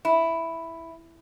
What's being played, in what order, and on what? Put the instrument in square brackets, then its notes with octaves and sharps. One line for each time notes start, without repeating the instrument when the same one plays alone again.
[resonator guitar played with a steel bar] E4